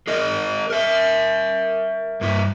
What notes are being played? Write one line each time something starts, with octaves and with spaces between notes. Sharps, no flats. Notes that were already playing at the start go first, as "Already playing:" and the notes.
G#4 A#4 D#5
A#4 E5
G2 E4